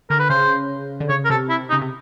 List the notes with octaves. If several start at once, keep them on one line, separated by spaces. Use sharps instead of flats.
D3 A#4
B4
C#3 C5
D3
C#3 C#5
A#4
C3 A4
E4
D#4
C#3
C3